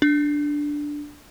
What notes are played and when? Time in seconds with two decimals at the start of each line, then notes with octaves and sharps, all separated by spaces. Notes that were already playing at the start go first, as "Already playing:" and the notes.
0.02 D4